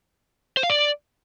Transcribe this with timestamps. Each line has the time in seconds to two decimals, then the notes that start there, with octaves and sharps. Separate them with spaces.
0.57 C5
0.63 F5
0.70 D5